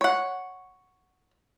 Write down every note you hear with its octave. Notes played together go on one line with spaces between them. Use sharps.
C#5 F#5